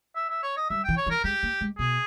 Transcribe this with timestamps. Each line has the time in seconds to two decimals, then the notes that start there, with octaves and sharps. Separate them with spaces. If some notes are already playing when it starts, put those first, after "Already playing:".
0.16 E5
0.30 E5
0.43 C#5
0.57 D#5
0.70 G3 E5
0.84 E3 G5
0.97 C#5
1.06 E3
1.11 A#4
1.24 G#3 G4
1.43 A#3
1.61 G#3
1.79 B2 G#4